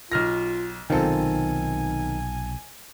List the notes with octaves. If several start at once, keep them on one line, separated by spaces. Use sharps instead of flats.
B1 F4 F6 A#6
B1 C3 D#3 C4 F4 A4 G#5